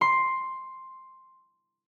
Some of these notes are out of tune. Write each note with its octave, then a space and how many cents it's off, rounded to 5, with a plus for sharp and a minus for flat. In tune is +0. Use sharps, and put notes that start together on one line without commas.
C6 +5